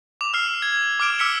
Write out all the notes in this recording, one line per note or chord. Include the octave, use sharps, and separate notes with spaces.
D6 F7
E6 F6 C7
G#6
D6 F6 D7 E7
D6 E6 F6 B6 C#7 G7